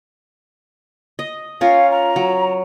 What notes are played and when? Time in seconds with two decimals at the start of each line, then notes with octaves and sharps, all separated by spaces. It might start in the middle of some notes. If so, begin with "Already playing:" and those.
1.19 D#5
1.61 C#4 F4 A#4 F5
1.91 A#5
2.16 F#3